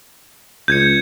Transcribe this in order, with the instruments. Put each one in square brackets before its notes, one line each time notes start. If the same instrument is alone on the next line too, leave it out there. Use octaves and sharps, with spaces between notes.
[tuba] C#2 [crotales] G6 G#6 C#7